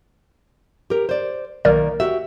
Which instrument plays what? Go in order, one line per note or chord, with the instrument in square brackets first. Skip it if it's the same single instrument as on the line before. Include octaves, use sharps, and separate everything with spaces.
[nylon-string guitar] G4 A#4
C5 D5
[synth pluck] B1 A#4 D5 [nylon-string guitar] D#3 A#3
[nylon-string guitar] F#4 G4 E5